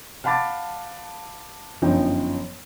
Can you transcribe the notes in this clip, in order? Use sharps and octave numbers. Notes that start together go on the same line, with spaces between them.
F5 F#5 A5 B5 D6 A6
G1 F#2 F3 D#4 G5